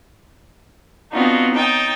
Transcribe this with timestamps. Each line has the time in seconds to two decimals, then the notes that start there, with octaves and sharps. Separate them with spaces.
1.12 B3 C4 D4 D#4 F4 F#4
1.52 C#4 D#4 G5 A5